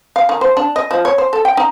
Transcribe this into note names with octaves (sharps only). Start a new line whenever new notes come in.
F5
D#3
C5
D4
D#5
F3
C#5
C5
A4
G5
D#4